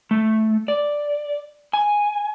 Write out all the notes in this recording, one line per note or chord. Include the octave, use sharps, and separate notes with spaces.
A3
D5
G#5